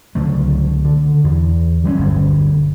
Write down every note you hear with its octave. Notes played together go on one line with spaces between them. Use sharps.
C#2 D3 F#3 A3
D3
E2
F#3 G3 C4 C#4
G1 D2 G2